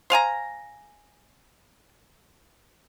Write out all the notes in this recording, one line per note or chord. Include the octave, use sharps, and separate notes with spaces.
C5 F5 G#5 A#5